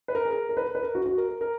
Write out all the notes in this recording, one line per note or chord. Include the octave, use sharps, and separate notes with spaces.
B4
A#4
G#4
A#4
A#4
B4
A#4
B4
A#4
F#4
F#4
A#4
A#4
A#4